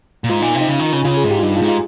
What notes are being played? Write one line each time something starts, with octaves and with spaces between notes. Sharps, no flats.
A#2
G#2 F4
A#2 D#4
C3
D#4
C#3
D#3
C#3
C#3 F4
G#4
G#2
G4
F4
G2 D#4
F4
G#2
F4